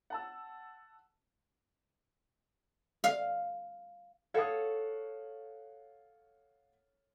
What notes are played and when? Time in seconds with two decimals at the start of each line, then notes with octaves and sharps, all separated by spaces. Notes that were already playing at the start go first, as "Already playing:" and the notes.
0.10 F#5 A5 E6
3.04 F5
4.34 A4 C#5 F5 F#5 D#6